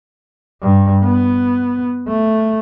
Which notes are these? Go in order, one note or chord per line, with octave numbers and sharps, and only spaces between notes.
G2
B3
A3